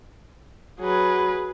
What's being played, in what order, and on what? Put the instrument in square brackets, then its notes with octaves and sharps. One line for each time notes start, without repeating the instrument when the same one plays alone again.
[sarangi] F#3 [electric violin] G#4 B4